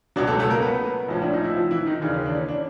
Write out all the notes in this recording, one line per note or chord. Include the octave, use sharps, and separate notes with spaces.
C#2 B2 F#3 D4 D5
A3 A4
A3 A4
A#3 A#4
B3 B4
A#1 A2 F3 C#4
D4
D#4
E4
F3 F4
E3 E4
D#3 D#4
D#2 C#3 E3 D4
C#4
D4
C#4
D4